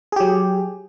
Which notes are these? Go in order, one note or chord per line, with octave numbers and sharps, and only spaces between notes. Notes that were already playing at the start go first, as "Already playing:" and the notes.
F#3 G4 G#4